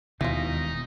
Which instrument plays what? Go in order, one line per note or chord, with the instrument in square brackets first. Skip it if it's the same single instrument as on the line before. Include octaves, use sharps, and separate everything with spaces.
[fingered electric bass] E1 D#2 [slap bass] B2 [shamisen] E3 F4 [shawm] D#4